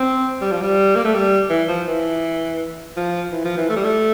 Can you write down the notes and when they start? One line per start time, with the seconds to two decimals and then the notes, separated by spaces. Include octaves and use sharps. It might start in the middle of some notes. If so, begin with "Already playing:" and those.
Already playing: C4
0.41 G3
0.51 F3
0.62 G3
0.96 A#3
1.05 A3
1.14 G3
1.50 E3
1.68 F3
1.87 E3
2.96 F3
3.32 E3
3.44 F3
3.57 E3
3.69 A3
3.76 G3
3.84 A3